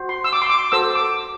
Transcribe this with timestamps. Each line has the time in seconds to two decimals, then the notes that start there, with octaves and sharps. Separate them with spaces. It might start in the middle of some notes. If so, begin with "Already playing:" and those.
Already playing: F#4 C5
0.09 C6
0.24 E6
0.33 D6
0.42 C6
0.50 D6
0.72 F#4 A4 C5 E6
0.95 D6